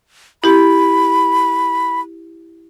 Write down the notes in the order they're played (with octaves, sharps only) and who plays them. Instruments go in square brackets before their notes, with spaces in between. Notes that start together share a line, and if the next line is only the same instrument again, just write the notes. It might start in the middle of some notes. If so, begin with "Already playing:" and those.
[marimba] E4 G4 [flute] B5